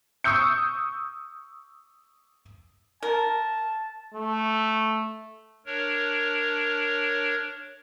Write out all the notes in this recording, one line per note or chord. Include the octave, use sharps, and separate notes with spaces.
C#6 D#6 E6 G6 C#7
A#4 A5
A3
D4 A#4 C#5